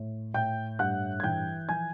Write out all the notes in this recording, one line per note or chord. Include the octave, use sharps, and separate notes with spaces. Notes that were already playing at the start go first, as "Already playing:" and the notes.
Already playing: A2
A2 G5 G6
G2 F#5 F#6
G#6
E3 G5 G6
F3 G#5 G#6